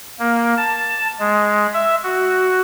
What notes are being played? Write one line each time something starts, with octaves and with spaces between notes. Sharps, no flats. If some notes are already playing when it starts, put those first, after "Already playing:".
A#3
A5
G#3
E5
F#4